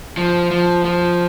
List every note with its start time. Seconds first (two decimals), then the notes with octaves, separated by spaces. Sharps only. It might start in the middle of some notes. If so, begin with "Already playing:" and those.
0.17 F3
0.51 F3
0.85 F3